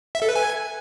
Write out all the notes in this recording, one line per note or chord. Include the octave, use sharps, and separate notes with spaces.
E5
A4
B4
G#5